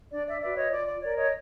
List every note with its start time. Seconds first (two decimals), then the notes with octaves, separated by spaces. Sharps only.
0.12 D4 D5
0.27 D5 E5
0.41 F#4 B4 D5 E5
0.56 C#5 D#5
0.71 F4 D5
0.86 D5
1.01 A#4 C#5 D5
1.16 C#5 D#5